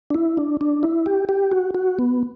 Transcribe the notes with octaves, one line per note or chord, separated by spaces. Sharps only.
D4
E4
D4
D4
E4
G4
G4
F#4
F#4
B3